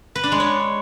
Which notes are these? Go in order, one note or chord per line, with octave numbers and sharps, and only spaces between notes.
B4
D4
G#3
C#5